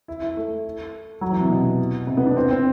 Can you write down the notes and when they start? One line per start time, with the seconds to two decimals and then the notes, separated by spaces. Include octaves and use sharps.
0.08 E4
0.22 E4
0.37 A3
1.21 F#3
1.32 E3
1.41 C3
1.50 B2
2.07 C3
2.17 B3
2.27 D4
2.37 C4
2.51 C4